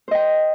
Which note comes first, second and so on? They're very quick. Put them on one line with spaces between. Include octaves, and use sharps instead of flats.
C5 D#5 G5